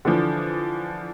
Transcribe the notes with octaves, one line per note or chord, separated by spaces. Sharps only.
D3 E3 F3